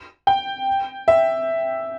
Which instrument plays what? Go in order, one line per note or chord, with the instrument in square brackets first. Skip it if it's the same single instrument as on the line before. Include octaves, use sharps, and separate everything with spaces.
[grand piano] G5
E5